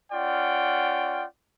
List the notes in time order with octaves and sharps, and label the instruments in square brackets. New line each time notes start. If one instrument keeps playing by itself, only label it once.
[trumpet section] C#4 F4 D5 F#5 G5